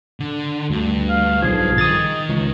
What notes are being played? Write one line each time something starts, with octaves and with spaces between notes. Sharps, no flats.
D3
D2 G2
F5
B1 F3 G#4
D#3 D#6 A6
C#2